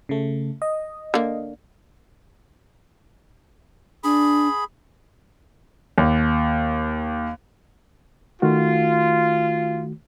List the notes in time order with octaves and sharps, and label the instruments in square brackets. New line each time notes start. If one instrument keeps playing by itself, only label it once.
[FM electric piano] C#3 A3
D#5
[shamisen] D3 A#3
[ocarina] D4 [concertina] G#4 B5
[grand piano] D#2
[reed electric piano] D#3 A3 F#4 [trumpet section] F4